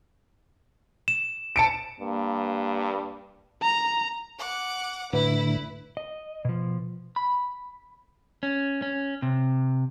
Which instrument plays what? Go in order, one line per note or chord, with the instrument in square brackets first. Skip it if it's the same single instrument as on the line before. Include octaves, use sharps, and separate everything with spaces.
[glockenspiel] E7
[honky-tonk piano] A5 C#7 D7
[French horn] G2 [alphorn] A#3
[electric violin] A#5
[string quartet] F#5 D6
[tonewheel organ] A2 D3 [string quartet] E4 [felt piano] B4
[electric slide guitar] D#5
B2 F3
[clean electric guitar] B5
C#4
C#4
C3